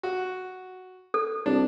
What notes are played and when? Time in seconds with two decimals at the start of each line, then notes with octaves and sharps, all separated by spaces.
0.03 F#4
1.14 A4
1.46 C2 D4